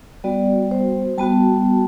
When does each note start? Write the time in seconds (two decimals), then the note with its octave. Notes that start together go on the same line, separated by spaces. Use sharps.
0.24 G3 B3 F#4 D5
0.71 C5
1.18 G3 B3 F#4 A5